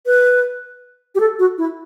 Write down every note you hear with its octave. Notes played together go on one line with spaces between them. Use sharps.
B4
G4
A4
F#4
E4